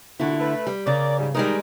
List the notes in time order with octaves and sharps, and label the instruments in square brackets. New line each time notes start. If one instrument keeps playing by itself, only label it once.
[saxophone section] A#2 F#4 [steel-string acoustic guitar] D3 E4
[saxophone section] A3 B4
[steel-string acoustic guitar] G3
[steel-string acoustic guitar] C#3 [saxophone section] A#4 D5
[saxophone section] G#2 G3
[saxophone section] D#3 D#4 [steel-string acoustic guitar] G3 G#3 A#4